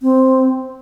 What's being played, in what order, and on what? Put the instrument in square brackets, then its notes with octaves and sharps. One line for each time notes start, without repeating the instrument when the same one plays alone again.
[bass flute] C4